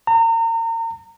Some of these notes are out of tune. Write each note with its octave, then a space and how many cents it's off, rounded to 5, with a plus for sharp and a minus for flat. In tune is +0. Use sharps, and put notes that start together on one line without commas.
A#5 -35